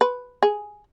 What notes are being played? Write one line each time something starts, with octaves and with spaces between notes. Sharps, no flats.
B4
G#4